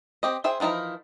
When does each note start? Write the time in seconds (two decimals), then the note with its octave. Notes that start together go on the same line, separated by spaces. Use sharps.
0.23 C4 G4 D#5
0.44 G#4 C5 E5 G5
0.60 E3 F3 D#4 E4 A#4